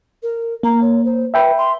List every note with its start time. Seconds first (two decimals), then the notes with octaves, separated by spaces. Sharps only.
0.22 A#4
0.63 A#3 A#5
0.81 C#5
1.04 C5
1.34 B4 E5 G5 B5
1.57 C6